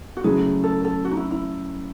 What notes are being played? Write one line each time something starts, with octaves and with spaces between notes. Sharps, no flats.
F#4
C#3 F#3 A3 E4 G#4
A4
A4
F#4
D#4
E4
E4